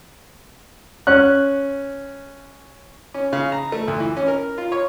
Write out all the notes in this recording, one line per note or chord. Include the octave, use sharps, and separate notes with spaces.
C#4 F#6
C#4
C#3
A#5
A3
D2
E3
C#4
A#4
F4
C#5